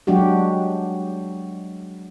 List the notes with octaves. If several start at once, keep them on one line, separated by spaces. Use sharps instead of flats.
F#3 G#3 D4 F#4 G4